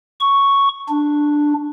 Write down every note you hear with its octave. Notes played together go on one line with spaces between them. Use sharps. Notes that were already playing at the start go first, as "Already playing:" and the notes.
C#6
D4